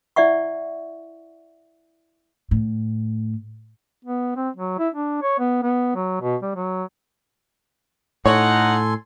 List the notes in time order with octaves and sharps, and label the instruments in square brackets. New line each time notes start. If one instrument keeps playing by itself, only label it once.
[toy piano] E4 D5 E5 F#5 C#6
[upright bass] A2
[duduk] B3
C4
F#3
E4
D4
C#5
B3
B3
F#3
B2
G3
F#3
[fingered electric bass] A2 [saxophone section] D#4 F#5 [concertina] A4 G#5 C6 [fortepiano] C#5